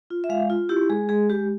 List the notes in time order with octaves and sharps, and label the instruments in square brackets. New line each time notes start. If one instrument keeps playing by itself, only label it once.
[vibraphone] F4
E5
G#3 F5
F4
E4 G4
G#3 G#4
G#3 G#4
G#3 G4